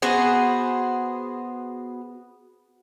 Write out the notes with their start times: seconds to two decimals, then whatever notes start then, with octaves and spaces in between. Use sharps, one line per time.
0.02 B3 F#4 G#4 C5